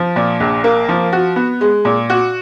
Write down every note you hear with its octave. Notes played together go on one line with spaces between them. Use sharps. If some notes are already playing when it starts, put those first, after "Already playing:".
Already playing: F3
A#2
A#1
A#3
F3
F#4
B3
G#3
A#2
F#4